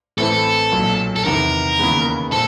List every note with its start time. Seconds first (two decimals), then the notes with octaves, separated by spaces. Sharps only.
0.18 A1 A2 E3 A3 C4 A4
0.71 B1 A#2 F#3
1.16 A4
1.25 E2 C3 D#3 A#4
1.79 D#2 C#3 E3 G#3 B3
2.31 A#2 G#3 C4 A4